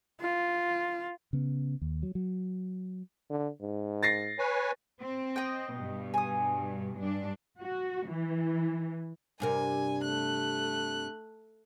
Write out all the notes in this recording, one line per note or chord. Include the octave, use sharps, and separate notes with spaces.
F4
C#3 B3
D#2
F#3
F#3
D3
G#2
A6 A#6 C7
B4 C#5 G#5
C4
D#5 G5
G2 B2
G#5 D#6
G2 D4
F#4
E3
G2 C3 A#4 G#5
A3 F#6